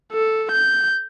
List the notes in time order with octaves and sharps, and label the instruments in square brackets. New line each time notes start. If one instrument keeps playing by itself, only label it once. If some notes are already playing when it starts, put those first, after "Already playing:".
[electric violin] A4
G6